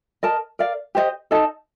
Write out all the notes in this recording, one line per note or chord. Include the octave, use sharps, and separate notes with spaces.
A#4 D#5 A5
A#4 D5 F5
G4 C5 D#5
D#4 A4 D#5 A5